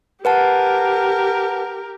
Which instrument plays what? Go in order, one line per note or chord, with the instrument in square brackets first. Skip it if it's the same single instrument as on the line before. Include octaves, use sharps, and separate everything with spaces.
[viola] G4 A#4 [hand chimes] B4 F#5 A5